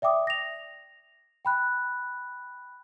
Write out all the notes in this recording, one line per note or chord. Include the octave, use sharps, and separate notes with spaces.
D5 E5 G5 D6 D#6
A#6 F7
G5 B5 F#6